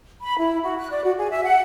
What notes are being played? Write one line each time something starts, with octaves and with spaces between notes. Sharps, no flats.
B5
E4
F#4
F#6
D5
F#4
G#4
E5
F#5